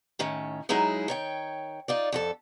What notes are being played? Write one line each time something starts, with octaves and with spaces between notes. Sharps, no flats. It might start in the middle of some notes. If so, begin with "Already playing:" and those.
A2 D#3 C#4
F#3 G#3 D#4 E4 G#4
D#3 C#5 G5
D#4 F4 D5
F2 F4 A4